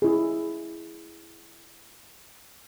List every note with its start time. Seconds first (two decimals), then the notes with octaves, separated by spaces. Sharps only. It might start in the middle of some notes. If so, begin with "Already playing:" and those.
0.02 E4 G#4